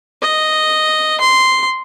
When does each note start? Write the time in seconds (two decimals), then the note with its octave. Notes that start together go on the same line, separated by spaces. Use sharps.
0.22 D#5
1.20 C6